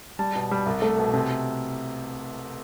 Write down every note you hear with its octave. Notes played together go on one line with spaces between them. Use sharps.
G3 A5
B2
G3
C2
A3
B2
C3